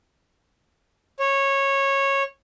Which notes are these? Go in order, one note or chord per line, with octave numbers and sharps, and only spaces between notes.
C#5